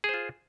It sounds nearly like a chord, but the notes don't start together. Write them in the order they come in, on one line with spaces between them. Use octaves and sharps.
G#4 C5 F4